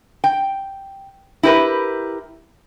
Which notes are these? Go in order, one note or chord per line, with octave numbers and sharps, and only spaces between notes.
G5
E4 G4 A#4 B4